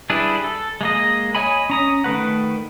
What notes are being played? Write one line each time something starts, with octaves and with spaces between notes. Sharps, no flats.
G3 D4 E4 G#4 B4
A4
G#3 A#3 D#5
C#5 D#5 G#5 B5
C#4 A#5 D#6
D#3 A3 B4 F#5